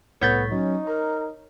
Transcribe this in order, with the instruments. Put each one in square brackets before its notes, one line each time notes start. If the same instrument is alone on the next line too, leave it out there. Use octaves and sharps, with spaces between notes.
[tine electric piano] C2 A2 B6 [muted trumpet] B3 [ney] A4 [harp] C#5 G6 A6
[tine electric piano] F#3 [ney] C#4 [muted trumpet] D#4
[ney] A#4 [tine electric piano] A#5